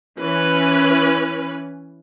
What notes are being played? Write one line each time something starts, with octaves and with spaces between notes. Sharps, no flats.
E3 C#4 B4